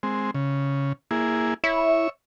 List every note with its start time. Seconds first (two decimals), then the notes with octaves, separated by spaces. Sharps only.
0.03 G#3 C4
0.35 C#3
1.11 A#3 E4 G#4
1.64 E4 C#5 E5